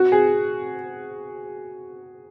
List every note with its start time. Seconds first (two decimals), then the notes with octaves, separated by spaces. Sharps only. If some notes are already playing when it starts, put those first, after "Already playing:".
Already playing: F#4
0.12 G#4